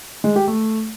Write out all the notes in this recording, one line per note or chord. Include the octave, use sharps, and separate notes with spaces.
G#3
G4
A3